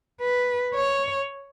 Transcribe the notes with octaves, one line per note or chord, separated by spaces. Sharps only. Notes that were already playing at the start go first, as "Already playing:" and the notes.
B4
C#5